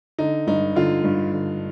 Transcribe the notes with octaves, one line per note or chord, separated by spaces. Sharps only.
D3 D#4
G2 D#4
D3 F4
G2
D3